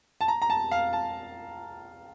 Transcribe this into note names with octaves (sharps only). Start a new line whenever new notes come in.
A5
A#5
A#5
A5
F5
A5